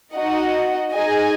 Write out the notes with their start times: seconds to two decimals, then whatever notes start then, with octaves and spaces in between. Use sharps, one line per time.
0.14 D#4 F#4 D#5 F#5
0.92 D#4 G#4 D#5 G#5